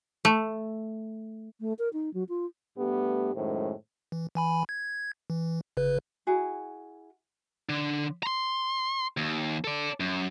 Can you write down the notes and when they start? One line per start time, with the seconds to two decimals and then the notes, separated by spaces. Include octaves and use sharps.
0.25 A3
1.60 A3
1.79 A#4
1.93 D#4
2.14 F#3
2.29 F4
2.77 G2 A3 B3 G4
3.35 F#2 A2 D#3 G#3 C5
4.12 E3
4.35 E3 G#5 B5
4.69 G#6
5.30 E3
5.77 G1 C#3 B4
6.27 E4 F#4 G#4
7.69 D3
8.23 A#5 C6
9.17 D#2
9.64 A4 D5
10.00 F#2